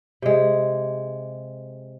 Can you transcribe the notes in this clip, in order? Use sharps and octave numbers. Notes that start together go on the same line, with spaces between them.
C3 G#3